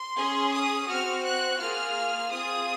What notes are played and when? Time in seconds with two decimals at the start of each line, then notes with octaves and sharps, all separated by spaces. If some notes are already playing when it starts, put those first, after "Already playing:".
Already playing: C6
0.17 C#4 G#4
0.53 D#6
0.89 C4 F#4 F6
1.24 F#6
1.59 A#3 F4 G#4 F6
2.30 C4 F4 G#4 D#6